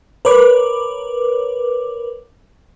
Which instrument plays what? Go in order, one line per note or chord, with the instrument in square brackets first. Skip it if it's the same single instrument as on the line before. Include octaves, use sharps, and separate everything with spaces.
[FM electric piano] A#4 B4 C#5 D6